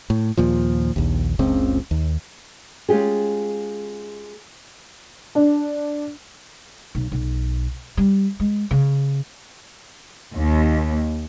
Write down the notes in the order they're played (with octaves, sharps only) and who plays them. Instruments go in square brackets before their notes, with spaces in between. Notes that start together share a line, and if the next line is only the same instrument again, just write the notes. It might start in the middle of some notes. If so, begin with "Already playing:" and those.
[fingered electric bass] A2
D#2 A#2 F3
A#1 D#2
F#1 C#2 C#3 C4
D#2
[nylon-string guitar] G#3 C#4 F4 G4 G#4
[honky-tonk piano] D4
[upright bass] B1
B1
G3
G#3
C#3
[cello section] D#2